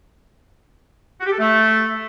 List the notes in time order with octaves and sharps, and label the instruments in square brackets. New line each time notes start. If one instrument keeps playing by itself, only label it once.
[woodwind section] F#4
G4
A4
A3